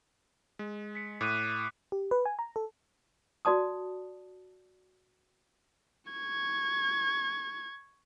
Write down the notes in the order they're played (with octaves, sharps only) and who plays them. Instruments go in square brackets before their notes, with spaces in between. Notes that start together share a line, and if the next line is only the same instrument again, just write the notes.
[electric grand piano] G#3
[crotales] B6 C#7
[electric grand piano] A2 [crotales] D6 F#6 D#7
[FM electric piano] G4
B4
G#5
A#5
A4
[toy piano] F#4 D5 A5 D#6
[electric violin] C#6 G#6